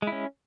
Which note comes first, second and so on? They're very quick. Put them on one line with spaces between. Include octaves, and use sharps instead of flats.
G#3 E4 C#4